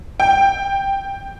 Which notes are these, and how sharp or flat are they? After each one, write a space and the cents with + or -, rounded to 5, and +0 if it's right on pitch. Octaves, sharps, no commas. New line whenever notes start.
G5 +5